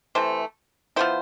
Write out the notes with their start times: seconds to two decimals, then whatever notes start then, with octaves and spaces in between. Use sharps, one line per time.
0.15 C3 E3 A3 C5
0.96 F3 B3 E4 C5